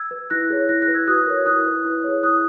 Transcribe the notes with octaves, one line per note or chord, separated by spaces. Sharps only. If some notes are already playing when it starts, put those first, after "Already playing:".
Already playing: E6 G#6
B4
E4 F#6 A#6
G#4 C#5
E4 F#6 A#6
F#6 A#6
B4
E6 G#6
F#4 D#6 F#6
A#4 C#5
E4 D#6 F#6
B4
E4
G#4 C#5
E4 D#6 F#6